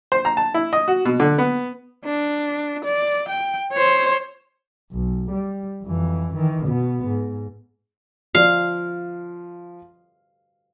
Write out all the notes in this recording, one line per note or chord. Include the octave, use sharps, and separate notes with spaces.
C5
A#5
A5
E4
D#5
F#4
B2
D3
B3
D4
D5
G5
C5 C#5
B1
G3
F2 E3
D#3 E3
B2 B3
G#2
F3 F5